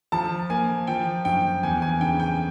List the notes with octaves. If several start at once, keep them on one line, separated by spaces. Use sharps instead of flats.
F3 A5
A#3 G#5
F3 G5
F#2 G5
E2 G#5
G#5
C#3 G5
G5